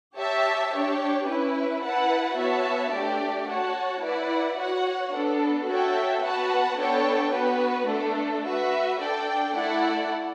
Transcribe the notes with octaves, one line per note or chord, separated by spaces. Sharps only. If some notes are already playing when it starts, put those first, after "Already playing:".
G4 C#5 E5 A5
D4 G4 C#5
C#4 E4 B4
E4 B4 F#5 A5
B3 F#4 C#5 E5 A5
A3 D4 G4 D5
F#4 C#5 F#5 A5
E4 B4 D5 F#5
F#4 C#5 F#5
B3 D4 A4
F#4 A4 C#5 E5 G5
B3 F#4 B4 F#5 A5
B3 D4 A4 C#5 G5
B3 F#4 B4
A3 D4 A4
F#4 B4 E5
D4 A4 D5 G5
A3 E4 A4 D5 F#5